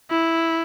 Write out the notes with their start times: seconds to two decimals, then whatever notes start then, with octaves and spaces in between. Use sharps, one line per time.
0.10 E4